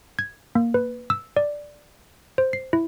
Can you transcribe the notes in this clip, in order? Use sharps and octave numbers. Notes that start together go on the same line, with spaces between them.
G#6
A#3
B4
E6
D5
C5
C7
E4